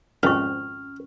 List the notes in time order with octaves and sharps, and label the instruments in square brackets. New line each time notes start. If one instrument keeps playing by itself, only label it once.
[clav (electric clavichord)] G#1 F2 [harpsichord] G#3 B4 [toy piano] C#4 C#6 [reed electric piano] F6